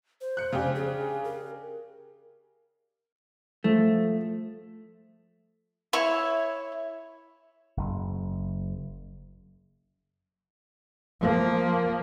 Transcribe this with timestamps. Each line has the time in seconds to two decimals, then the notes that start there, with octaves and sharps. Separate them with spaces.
0.21 C5
0.37 F#6 C#7
0.53 C#3 D4 G4
0.75 G#4
1.24 A#4
3.64 F3 A3
5.93 E4 C#5 E5 C#6
7.77 F#1
11.21 F3 A#3